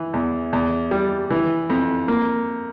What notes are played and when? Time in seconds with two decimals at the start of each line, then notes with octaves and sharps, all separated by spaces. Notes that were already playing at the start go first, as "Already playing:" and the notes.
Already playing: E3
0.13 E2
0.53 E2
0.91 G3
1.30 E3
1.69 F2
2.08 A#3